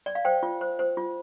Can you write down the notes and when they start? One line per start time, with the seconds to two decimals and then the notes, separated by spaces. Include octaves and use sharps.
0.06 D5
0.15 F5
0.25 C5 G5
0.43 F4
0.61 C5
0.79 C5
0.97 F4